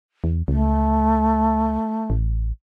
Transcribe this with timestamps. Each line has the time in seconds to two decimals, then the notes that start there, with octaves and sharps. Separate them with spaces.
0.24 E2
0.48 C#2 A3
2.10 A1